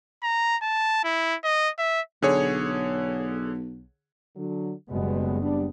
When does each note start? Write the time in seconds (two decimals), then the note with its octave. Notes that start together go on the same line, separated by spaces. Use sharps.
0.23 A#5
0.62 A5
1.04 E4
1.44 D#5
1.79 E5
2.22 B1 D3 G#4 C#5
4.37 D3 F#3
4.90 F#1 B2 G3 G#3 B3
5.41 G3 D4